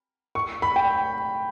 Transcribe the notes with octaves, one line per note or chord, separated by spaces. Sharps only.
C#6
B5
G5